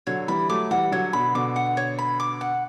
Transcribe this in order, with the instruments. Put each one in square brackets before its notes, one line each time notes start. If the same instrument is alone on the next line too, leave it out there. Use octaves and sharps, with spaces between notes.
[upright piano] D3 F#3 [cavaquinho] C#5
[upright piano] E3 G3 [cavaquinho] B5
[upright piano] F#3 A3 [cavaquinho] D6
[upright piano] E3 G3 [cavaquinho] F#5
[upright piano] D3 F#3 [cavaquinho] C#5
[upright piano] B2 D3 [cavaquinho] B5
[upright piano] B2 D3 [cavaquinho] D6
[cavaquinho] F#5
C#5
B5
D6
F#5